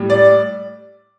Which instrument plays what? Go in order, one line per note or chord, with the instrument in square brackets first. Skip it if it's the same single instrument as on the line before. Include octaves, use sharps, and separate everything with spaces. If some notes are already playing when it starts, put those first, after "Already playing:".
Already playing: [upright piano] A2 G3
D5